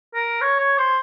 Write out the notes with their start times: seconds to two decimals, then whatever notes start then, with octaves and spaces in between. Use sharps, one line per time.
0.14 A#4
0.41 C#5
0.59 C#5
0.78 C5